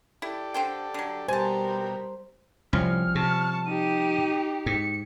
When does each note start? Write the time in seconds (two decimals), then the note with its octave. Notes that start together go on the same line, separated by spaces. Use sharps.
0.22 E4 G4 A4 D5
0.54 D3 C5 G5
0.94 D3 F#3
1.28 B2 G3 G4 A#4 C5 G#5 A5
2.73 C2 F3 G3 C#4 F6
3.15 C3 A5 C#6
3.66 D#4 G4 D#7
4.66 G#2 C#7